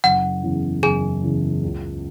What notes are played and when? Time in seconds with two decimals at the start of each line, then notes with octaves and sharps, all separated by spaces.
0.04 F#1 F#5
0.43 E2 C#3 E3
0.83 F#1 G#4 G#5
1.23 E2 C#3 E3
1.62 C#2